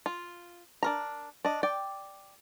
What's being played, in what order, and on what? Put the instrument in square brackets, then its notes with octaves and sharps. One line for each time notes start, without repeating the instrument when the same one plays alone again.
[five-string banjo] F4
D4 A#4 A#5
D4 D#5
D5 G5